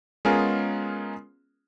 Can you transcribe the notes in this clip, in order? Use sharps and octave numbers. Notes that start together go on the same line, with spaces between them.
G#3 B3 C#4 F4 G#4 A#4